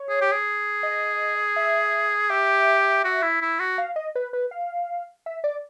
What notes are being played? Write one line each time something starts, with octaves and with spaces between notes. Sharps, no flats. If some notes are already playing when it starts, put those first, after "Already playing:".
Already playing: C#5
G#4
G4
G#4
D#5
E5
G4 E5
F#4
E4
E4
F#4
F5
D#5
B4
B4
F5
E5
D5